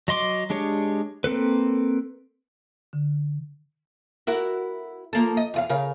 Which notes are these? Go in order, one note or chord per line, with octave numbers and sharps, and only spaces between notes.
F#3 D#5 C6 D6
G#3 D4 G4 C#5
A#3 C4 A4 B4
D3
E4 F#4 A#4
F3 A#3 A4
D#5
E2 F4 F5
C#3 A#4 F5